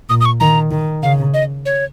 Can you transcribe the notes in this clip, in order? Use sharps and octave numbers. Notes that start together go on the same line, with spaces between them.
A#2 D#6
D#6
C#6
D#3 A#5
D#3
C#3 F5
D#5
C#5